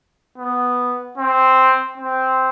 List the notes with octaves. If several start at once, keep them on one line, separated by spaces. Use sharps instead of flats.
B3
C4
C4